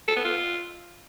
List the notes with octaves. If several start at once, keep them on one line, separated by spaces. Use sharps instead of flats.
A4
B3
F4